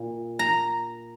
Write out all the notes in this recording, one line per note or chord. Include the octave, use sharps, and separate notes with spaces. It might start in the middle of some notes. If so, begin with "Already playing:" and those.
Already playing: A#2
A#5